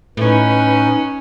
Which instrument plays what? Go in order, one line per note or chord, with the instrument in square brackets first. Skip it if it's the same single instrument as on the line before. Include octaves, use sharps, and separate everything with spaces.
[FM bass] A2 [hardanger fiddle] C#4 [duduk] D#4 [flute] B4